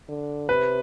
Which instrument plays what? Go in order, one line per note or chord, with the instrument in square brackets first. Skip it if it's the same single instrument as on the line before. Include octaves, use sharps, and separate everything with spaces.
[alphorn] D3
[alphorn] C3 [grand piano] B4